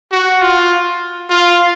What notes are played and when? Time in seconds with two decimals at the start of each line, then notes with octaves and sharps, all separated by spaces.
0.12 F#4
0.41 F4
1.29 F4